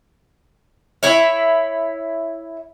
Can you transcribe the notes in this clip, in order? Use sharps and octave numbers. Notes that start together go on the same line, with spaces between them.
E4 C#5 E5